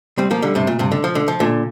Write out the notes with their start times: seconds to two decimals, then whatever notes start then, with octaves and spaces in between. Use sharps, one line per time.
0.18 G3 C4
0.31 F3 A#3
0.42 D3 G3
0.55 G2 C3
0.67 A#2
0.79 G2 C3
0.92 D3
1.04 F3
1.15 D3
1.28 F3
1.40 A#2 D3